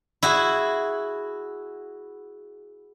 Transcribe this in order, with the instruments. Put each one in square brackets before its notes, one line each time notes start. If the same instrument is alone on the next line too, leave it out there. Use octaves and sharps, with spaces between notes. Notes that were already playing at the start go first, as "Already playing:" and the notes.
[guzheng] E4 F#4 G#4